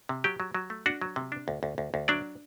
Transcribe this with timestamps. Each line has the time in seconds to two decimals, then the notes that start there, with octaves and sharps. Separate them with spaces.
0.09 C3
0.24 F#3 G4 G5
0.40 F#3
0.55 F#3
0.70 A3
0.86 D4 F#4 F#5
1.01 F#3
1.16 C3
1.32 D4
1.48 D2
1.63 D2
1.78 D2
1.94 D2
2.08 F#3 D4 D5